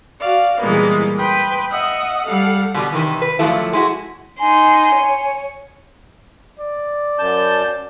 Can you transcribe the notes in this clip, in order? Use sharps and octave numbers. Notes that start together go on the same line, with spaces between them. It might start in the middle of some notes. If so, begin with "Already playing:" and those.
F#4 D5 F5
A#2 E3 G3 G#3 A#3 B3
B4 G5 C6 D#6
D#5 E5 F#5 D#6
G3 A4 F5 F#5
B2 D3 G3
C3 D#3 E3
B4
F#2 D3 F3 F#3 A3 E4
G#3 E4 F#4
D#4 G#5 C6
C#5
D5
F#2 A5 G6